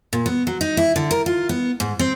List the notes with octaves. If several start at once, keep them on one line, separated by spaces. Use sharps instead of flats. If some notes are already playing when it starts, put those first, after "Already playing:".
A#2
B3
F#3
D#4
E4
D3
A#4
F4
B3
G#2
C4